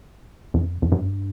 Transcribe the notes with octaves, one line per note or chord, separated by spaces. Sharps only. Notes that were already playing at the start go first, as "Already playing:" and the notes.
F2
F2
G2